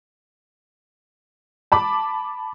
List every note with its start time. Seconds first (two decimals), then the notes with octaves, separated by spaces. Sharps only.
1.72 A5 B5 D6